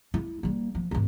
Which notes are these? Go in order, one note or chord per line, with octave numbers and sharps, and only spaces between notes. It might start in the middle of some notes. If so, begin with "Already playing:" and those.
G#3 E4
G3 A#3
F3
G#1 D2